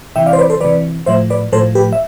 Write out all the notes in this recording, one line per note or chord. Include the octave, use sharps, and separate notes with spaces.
C3 E3 E5 G5
D5 F5
C5
B4 D5
A4 C5
C3 E3 B4 D5
A2 F3 C5 E5
B4 D5
A2 F3 A4 C5
G4 B4
E5